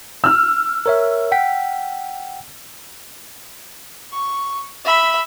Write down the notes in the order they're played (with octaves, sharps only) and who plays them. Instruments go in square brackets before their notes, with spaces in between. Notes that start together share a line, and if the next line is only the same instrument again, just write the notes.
[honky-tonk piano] E6 F6
[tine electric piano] A#4 C#5 E5
F#5 G5 B6
[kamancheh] C#6
E5 B5